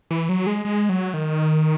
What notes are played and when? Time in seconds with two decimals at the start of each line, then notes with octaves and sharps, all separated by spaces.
0.11 E3
0.29 F#3
0.47 G#3
0.65 G#3
0.89 F#3
1.14 D#3